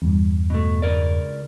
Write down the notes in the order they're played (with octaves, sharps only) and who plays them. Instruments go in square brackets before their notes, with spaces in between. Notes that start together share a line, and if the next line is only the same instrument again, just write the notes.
[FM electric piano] E2 G2
[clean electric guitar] B2 A3
C#2 A#4 D5